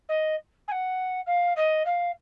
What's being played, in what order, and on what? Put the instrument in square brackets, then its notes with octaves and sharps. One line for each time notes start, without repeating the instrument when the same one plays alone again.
[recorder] D#5
G#5
F#5
F5
D#5
F5